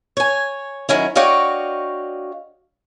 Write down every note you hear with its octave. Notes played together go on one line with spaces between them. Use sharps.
C#5 G#5
D#3 F#3 C#4 E4
D4 F#4 C#5 D#5 F5 G5